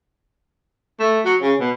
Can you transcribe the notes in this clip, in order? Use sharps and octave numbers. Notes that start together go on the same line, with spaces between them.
A3
F#3
C#3
B2